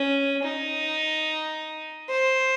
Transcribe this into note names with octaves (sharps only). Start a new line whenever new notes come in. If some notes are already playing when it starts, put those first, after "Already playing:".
Already playing: C#4
D#4
C5